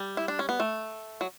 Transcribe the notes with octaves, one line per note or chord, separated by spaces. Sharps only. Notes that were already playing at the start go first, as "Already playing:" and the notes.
Already playing: G3
E4
D4
C#4
B3
A3
F#3